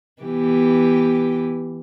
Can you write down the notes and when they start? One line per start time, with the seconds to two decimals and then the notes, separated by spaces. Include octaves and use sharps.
0.22 E3 B3 G4